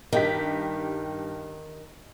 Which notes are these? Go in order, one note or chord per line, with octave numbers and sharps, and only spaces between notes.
G2 D#3 G4 B6